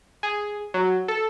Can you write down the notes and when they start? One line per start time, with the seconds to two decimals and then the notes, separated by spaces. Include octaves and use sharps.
0.23 G#4
0.74 F#3
1.08 A4